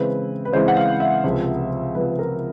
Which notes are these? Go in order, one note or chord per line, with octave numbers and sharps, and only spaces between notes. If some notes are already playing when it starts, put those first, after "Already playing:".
Already playing: C#3 E3 G#3 C4 E4 B4
B4
C#3 E3 G#3 C4 E4 C5
F#5
F5
E5
C#2 C3 F3
C#2 C3 F3 B4
A#4